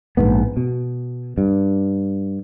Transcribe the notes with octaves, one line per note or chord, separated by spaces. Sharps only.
A#1 E2 G#2 B3
B2
G2